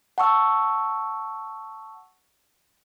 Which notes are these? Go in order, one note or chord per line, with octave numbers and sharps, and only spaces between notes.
F#5 A5 C#6 E6